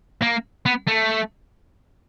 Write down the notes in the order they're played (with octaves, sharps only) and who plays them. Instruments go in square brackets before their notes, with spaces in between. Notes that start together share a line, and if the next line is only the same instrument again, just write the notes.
[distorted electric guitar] A#3
B3
A3